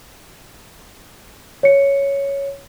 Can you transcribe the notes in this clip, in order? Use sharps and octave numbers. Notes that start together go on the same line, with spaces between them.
C#5 C#7